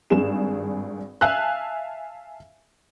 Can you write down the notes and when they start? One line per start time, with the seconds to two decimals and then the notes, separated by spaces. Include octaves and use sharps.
0.10 G#1 G2 G#4 E7
1.21 E5 F5 G#5 A5 E6 F#6